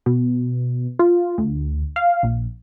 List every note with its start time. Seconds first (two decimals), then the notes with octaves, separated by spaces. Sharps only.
0.06 B2
0.99 F4
1.38 D2
1.96 F5
2.23 A#1